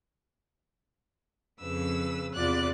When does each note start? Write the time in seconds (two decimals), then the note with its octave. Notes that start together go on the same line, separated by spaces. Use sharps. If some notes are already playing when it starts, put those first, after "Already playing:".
1.61 F2 C#3 B4 E6
2.34 E2 C3 F4 D5 F#6